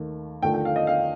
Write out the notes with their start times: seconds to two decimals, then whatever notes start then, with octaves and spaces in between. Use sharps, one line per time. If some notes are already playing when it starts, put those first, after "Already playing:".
Already playing: D#2 D#3 A3
0.42 D#2 D3 F3 A3 G5
0.54 G5
0.65 F5
0.76 D#5
0.87 F5